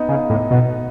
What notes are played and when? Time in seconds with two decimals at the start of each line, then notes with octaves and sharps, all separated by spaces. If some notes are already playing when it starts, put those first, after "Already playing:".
Already playing: B3 D#4
0.09 C#3
0.30 A2
0.51 B2